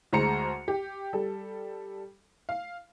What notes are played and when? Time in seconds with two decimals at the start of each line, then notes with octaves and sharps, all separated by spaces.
0.13 D2 G#3 C5 A#5 C6 C#7
0.68 G4
1.13 G3 A4
2.49 F5